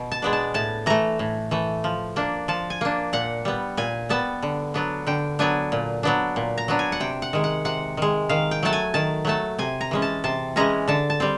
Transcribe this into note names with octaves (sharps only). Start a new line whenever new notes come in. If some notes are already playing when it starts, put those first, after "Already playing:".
Already playing: B2
A5
G#3 B3 D4
A5
A2 A5
E3 A3 A#5
A2
E3 A3
F3
A#3 D4
F3 A5
G#5
A#3 D4
A#2 F#5
G3 B3
A#2 G#5
G3 B3 A5
D3
F#3 B3 D4
D3 G5
F#3 B3 D4 G#5
A#2
F#3 B3 D4
A#2
A#5
F#3 B3 D4
G#5
F#5
C3 G5
F#5
D#3 G#3
F#5
C3 F#5
D#3 G#3
D#3 F5
G5
F#3 A3 A5
G#5
D#3 A5
F#3 A3 A5
C3 G#5
A#5
E3 G#3 C#4
A5
C3 A5
E3 G#3 C#4 A#5
D3 A5
A5
G3 C4